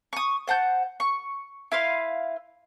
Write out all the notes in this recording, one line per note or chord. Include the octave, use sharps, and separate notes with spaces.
C#6 D#6
C5 F#5 A5 G6
C#6
E4 B4 F5 C6